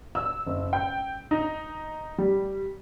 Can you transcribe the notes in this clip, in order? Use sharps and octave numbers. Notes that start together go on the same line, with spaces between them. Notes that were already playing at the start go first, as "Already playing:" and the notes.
E6
F#1
G5
D#4
G3